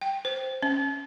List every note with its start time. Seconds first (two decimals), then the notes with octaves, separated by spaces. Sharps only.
0.01 G5
0.25 C5
0.63 C#4